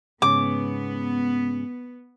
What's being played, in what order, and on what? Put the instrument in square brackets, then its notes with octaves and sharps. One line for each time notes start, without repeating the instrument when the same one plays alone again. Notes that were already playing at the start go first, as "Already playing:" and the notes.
[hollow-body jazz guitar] G#2 C#3 [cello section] B3 [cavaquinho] D6